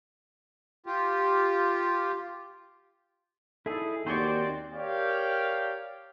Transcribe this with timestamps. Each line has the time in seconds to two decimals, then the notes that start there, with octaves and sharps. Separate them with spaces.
0.86 F4 G4
3.66 D#4 E4 G#4 A4
4.07 D#2 C4 F#4 C5 D5 G#5 C6 C#6
4.73 G4 A#4 C#5 D5 F5 G5